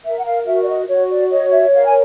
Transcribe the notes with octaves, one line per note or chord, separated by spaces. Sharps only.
A#4 E5
F#5
F5
F#4 E5
D5
D#5
F#4 C#5
D5
C#5 D#5
E5
A#4 F5
G#5